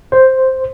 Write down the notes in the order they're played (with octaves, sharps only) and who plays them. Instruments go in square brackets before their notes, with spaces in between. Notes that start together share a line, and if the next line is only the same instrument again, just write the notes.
[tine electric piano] C5